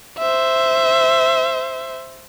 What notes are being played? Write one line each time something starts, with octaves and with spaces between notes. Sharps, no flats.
C5 E5